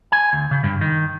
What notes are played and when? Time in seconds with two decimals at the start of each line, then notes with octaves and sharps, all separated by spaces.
0.12 G#5
0.33 D2
0.51 C#3
0.64 G2
0.81 D#3